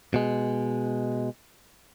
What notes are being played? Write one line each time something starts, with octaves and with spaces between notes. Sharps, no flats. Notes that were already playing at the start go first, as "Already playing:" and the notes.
B2 G#3